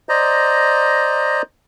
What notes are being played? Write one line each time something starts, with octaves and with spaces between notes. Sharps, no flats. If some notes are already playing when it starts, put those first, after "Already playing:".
C5 D5 D#5 A#5